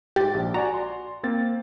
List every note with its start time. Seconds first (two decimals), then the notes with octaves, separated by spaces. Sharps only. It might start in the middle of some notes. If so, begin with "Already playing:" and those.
0.16 G#2 G4 A6
0.34 A#1
0.54 F#4 D5 G#5 A#5
0.74 C6
1.23 A#3 C4 A6